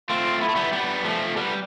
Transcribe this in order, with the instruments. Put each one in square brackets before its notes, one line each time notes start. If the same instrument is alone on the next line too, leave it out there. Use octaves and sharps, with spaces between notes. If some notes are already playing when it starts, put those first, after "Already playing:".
[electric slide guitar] A3 C4 [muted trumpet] F4
[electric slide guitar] B3 [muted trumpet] E4
[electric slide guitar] A3
G3 B3
G3 B3
F3 A3
G3 B3